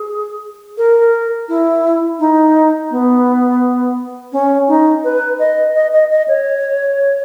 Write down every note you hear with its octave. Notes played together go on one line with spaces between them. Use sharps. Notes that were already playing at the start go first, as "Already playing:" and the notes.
Already playing: G#4
A#4
E4
D#4
B3
C#4
D#4
B4
D#5
D#5
D#5
D#5
C#5